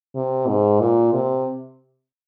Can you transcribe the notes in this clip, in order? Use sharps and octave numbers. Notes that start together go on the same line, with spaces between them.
C3
G#2
A#2
C3